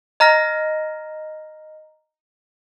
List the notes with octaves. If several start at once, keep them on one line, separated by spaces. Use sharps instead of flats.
D#5 A#5 F6 A#6